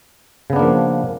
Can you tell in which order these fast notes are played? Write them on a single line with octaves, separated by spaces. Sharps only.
C#3 B3 D4 A#3 F3